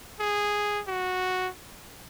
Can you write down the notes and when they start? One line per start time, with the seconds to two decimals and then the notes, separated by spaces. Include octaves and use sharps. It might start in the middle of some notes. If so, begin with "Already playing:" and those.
0.20 G#4
0.88 F#4